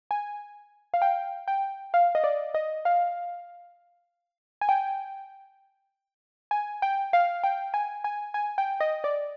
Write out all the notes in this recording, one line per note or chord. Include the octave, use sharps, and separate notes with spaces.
G#5
F5
G5
G5
F5
D#5
D5
D#5
F5
G#5
G5
G#5
G5
F5
G5
G#5
G#5
G#5
G5
D#5
D5